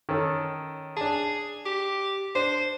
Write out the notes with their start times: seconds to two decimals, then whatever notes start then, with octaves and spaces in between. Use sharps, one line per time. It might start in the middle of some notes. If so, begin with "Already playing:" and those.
0.09 D#3 C#4 A4
0.97 D4 G#4 A5
1.66 G4
2.35 D4 C5